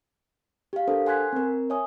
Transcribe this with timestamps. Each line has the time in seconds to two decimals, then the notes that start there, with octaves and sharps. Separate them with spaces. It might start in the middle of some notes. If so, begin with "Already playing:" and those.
0.73 G4 F5
0.88 D4 A4 A#4 C5
1.06 F#5 G#5 C6 F#6 G#6 B6
1.33 C4 A#4
1.70 C#5 E5 G#5 D#6